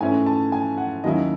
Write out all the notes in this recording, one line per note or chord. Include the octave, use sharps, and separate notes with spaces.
G#2 E3 A3 C#4 E4 G#5
A5
G#5
F#5
D#2 D#3 F#3 C#4 E4 D#5